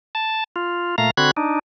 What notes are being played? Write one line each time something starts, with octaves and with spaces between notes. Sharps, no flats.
A5
F4
A#2 A3 F5 A#5
D3 C4 F#4 B5 F#6 G#6
D4 D#4